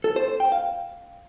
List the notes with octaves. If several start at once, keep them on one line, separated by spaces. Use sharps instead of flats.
A4
C5
C5
G5
F5